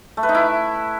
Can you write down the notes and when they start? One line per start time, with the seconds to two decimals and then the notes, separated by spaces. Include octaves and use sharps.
0.17 A3
0.23 B4
0.29 D#4
0.35 E4